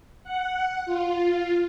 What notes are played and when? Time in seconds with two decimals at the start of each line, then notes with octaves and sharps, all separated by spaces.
0.24 F#5
0.86 F4